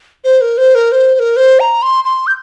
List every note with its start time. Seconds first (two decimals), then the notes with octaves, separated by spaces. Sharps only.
0.24 C5
0.41 A#4
0.58 C5
0.75 A#4
0.92 C5
1.15 C5
1.19 A#4
1.37 C5
1.60 A#5
1.82 C6
2.04 C6
2.27 G6